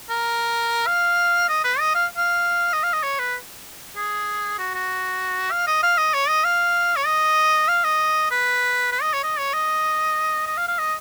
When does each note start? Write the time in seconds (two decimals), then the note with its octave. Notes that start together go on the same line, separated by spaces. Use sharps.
0.10 A#4
0.87 F5
1.49 D#5
1.64 B4
1.80 D#5
1.95 F5
2.17 F5
2.73 D#5
2.83 F5
2.93 D#5
3.03 C#5
3.19 B4
3.96 G#4
4.58 F#4
4.75 F#4
5.52 F5
5.67 D#5
5.83 F5
5.98 D#5
6.14 C#5
6.29 D#5
6.44 F5
6.96 C#5
7.06 D#5
7.68 F5
7.84 D#5
8.31 B4
8.92 B4
9.02 D#5
9.13 C#5
9.24 D#5
9.39 C#5
9.54 D#5
10.47 D#5
10.57 F5
10.68 F5
10.78 D#5